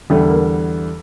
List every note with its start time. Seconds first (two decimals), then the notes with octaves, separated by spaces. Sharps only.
0.10 E2 D3 G3 A3
0.30 A#3